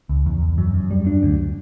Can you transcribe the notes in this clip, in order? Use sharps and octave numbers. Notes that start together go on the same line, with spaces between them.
C#2
E2
E2
F#2
F#2
G3
D4
D2